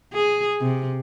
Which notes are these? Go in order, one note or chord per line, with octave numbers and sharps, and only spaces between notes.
G#4
C3